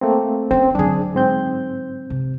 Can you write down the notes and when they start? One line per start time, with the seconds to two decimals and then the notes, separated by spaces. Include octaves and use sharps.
0.01 A3 A#3 C4
0.51 C4 C#4 E4
0.75 D3 F#3 D4 G#4
1.15 G#2 C4 G6
2.10 C3